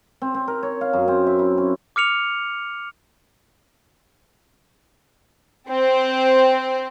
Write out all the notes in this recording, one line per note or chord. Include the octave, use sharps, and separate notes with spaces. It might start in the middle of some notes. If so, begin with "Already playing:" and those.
C4
C4
A#4
C#5
F5
F#2
C4
E5
E4
C#4
D6 F6 C#7 F7
C4